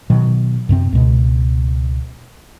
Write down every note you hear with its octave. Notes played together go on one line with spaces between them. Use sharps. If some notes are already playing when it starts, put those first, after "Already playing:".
B2 D#3 F#3
F#2 C3 C4
C#2 B2